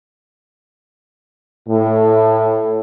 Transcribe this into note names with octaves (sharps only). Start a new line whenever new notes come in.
A2